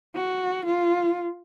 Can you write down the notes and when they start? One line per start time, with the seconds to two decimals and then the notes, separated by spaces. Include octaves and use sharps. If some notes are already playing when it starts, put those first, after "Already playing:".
0.16 F#4
0.66 F4